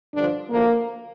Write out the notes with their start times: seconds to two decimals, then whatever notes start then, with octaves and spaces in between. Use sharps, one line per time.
0.14 G2 D3 F3 D4
0.50 D2 D3 F3 A#3